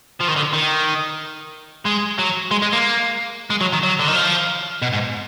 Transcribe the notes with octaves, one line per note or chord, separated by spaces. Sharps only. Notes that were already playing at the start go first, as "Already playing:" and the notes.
F3
D#3
D3
D#3
G#3
F#3
G#3
G#3
A#3
G#3
F#3
D#3
F#3
D3
D#3
F3
B2
G#2